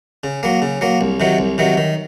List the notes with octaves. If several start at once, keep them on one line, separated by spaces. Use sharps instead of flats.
C#3
F#3 A#3
C#3
F#3 A#3
C2
C3 D#3 F#3
C2
C3 D#3 F#3
D#3